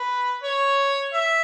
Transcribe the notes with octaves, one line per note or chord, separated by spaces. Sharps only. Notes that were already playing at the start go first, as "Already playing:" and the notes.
Already playing: B4
C#5
E5